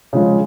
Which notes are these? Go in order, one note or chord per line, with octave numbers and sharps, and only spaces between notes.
C#3 F3 G#3